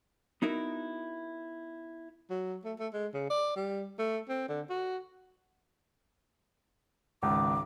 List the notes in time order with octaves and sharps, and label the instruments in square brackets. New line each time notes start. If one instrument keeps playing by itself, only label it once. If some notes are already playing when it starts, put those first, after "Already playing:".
[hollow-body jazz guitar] B3 D#4 E4 F#4 A#4
[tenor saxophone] F#3
A3
A3
G#3
C#3
D5
G3
A3
C4
D3
F#4
[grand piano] G#1 C#2 [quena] D6